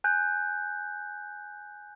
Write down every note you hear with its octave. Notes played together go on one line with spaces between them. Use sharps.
G#5 F#6 G6